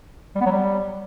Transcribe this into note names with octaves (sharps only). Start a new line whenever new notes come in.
G3
B3
F#3
G3